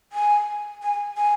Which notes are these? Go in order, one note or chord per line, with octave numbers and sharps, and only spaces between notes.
G#5
G#5
G#5